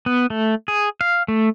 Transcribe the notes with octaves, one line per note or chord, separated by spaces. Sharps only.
B3
A3
G#4
F5
A3